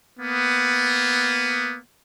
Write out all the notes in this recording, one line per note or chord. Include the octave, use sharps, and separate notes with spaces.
A#3 B3